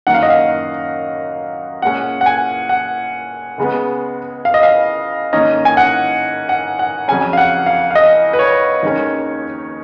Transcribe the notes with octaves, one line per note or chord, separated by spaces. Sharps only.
F#2 D#3 A#3 F#5
F5
D#5
F5
A#2 G#3 C#4 F#5
F#5
G#5
F#5
C#2 C#3 G#3 B3
F5
D#5
F5
G#2 D#3 A#3 C#4 D#5
G#5
F#5
F#5
F#5
F2 C#3 F#3 C#4 G#5
F5
F#5
F5
F5
D#5
B4
C#5
D#2 D#3 G#3 C#4